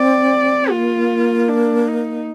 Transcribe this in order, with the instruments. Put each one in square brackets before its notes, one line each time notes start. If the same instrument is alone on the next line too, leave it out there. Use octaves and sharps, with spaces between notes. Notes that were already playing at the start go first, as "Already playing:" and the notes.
Already playing: [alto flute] C4 [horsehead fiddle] D5
[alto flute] A#3 [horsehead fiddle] F4
[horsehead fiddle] D4
D#4